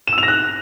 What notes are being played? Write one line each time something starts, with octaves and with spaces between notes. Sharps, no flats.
E7
E6
F7
A#6
F#6